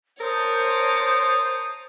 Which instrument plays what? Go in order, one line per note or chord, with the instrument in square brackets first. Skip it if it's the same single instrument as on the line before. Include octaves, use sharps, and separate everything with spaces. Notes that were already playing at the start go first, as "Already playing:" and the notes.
[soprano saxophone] A#4 [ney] C5 [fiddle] C#5 A5 [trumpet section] D#6